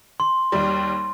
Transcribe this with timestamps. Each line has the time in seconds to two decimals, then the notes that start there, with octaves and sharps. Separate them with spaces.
0.20 C6
0.52 D#2 G3